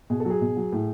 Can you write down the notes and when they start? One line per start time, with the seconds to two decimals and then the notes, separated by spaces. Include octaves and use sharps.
0.10 B2 G#4
0.20 A4
0.25 F#3 G#4
0.41 B2
0.57 F#3
0.72 A2